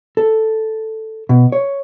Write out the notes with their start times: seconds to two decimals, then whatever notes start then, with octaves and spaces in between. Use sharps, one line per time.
0.17 A4
1.29 B2
1.52 C#5